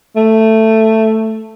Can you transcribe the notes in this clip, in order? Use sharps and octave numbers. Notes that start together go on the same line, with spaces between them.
A3